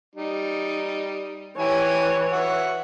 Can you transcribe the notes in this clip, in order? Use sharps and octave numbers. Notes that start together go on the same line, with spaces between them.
G3 D#4
E3 E4 G4 C#5 G#5
F#4 E5 F#5